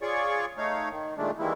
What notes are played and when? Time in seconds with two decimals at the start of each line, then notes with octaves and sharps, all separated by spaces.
0.02 F4 G#4 C#5 D5 C#6
0.58 A3 D#4 C#5 F5
0.90 D#3
1.18 A#2 D#3 G#3 A3 D4
1.39 D#3 E3 G3 G#3 A#3 E4